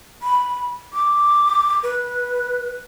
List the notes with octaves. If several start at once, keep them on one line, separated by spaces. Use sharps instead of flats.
B5
D6
B4